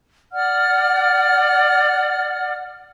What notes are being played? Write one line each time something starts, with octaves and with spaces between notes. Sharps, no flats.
D5 F#5 F6